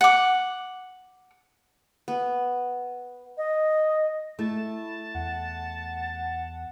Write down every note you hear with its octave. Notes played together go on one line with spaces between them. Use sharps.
F#5 D6
B3
D#5
A3 E4 A5
E2 F#5